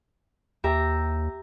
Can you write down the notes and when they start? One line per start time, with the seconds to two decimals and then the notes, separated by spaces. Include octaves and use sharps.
0.64 D#2 G4 E5 A#5